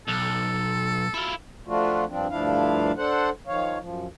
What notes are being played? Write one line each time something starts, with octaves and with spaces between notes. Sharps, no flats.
B1 A4
E4 F4
F3 A3 D4 F4 F#4
G2 F3 C4 D4
D2 G2 F3 D4 E4 F5
D4 A4 C5 F#5
D#3 F3 C#5 F5
F#2 F3